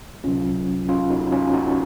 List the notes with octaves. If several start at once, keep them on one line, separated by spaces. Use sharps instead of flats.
C#2 C3 F#3 C#4 F4
C#4 F4
D#4 F#4
C#4 F4
D#4 F#4